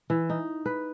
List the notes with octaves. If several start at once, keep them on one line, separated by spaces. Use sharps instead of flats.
E3
D#4
B4